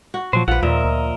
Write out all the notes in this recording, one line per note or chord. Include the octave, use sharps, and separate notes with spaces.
F#4
A#2 F3 F#3 C5
A#1 F3 B4 F#5
D#2 A#2 A#4 D#5 E5
D2